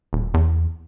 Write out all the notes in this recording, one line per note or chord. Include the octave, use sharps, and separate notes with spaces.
D#1
E2